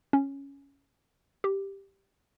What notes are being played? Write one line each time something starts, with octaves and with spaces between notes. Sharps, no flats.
C#4
G4